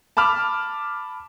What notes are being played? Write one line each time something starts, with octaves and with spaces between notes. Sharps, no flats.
A5 B5 D6 F6